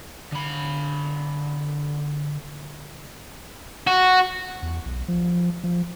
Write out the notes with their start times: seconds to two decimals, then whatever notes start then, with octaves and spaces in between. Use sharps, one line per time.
0.32 D3 B5
3.87 F#4
4.62 E2
4.86 B1
5.08 F3
5.64 F3